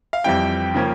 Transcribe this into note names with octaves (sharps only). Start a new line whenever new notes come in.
F5
F2 E3 G3 C4 G5
C#3 F3 A#3 C#4